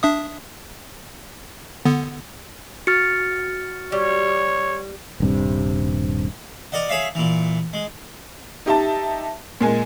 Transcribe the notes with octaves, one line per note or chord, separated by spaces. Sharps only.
D4 E5 D#6
D3 B3
F#4 F6 A6 C#7
G3 C#5
D#1 G2 C3
A#4 D5 D#5 F#5
G#4 C#5 E5 F5
A#2 E3
G#3
D#4 G4 E5 A5
A#2 G#3 G#5